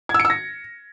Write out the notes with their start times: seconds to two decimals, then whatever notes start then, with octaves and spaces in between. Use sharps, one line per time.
0.09 G#6
0.14 E6
0.20 C#7
0.25 E6
0.30 A#6